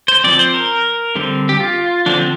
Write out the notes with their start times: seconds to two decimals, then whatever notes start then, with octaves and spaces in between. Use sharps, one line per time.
0.08 C5
0.24 F3 C4 D5
0.39 C5
0.54 A#4
1.15 D3 G3 C4
1.49 G4
1.60 F4
2.06 D3 F3 C4 D4